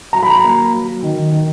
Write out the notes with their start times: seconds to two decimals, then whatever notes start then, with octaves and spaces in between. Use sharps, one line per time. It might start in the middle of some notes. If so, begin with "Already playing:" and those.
0.13 F#3 A#5
0.23 B5
0.30 A#5
0.43 A#3
0.73 F#3
1.03 D#3
1.32 D#3